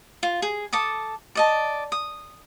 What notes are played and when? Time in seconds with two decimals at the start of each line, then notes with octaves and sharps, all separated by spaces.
0.23 F4
0.42 G#4
0.73 A4 A5 D6 D#6
1.35 D5 D#5 A5
1.92 D#6